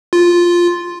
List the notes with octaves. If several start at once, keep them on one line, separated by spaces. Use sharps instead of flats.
F4